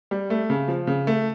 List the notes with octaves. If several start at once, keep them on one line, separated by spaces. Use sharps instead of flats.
G3
A3
C#3
F3
C#3
A3